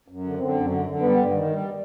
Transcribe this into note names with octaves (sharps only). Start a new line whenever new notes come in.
F#2
D3
D3 C4
F#2
D3
D3
G3 B3
G2
D#3
G3